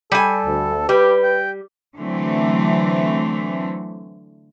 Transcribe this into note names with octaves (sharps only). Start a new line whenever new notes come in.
G3 A4 G#5
D2
G3 G4 B4
G5
D3 E3 F#3 A3 C4